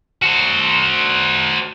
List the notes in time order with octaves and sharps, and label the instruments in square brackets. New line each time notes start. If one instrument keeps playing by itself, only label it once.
[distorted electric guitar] F#4 C5